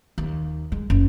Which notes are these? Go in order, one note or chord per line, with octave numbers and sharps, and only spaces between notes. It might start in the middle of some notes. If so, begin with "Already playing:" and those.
D#2
G#3
F#1